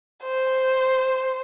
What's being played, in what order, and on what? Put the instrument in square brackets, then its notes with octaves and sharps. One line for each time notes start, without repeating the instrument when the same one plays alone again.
[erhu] C5